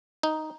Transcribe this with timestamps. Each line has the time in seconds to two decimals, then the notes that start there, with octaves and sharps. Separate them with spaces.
0.23 D#4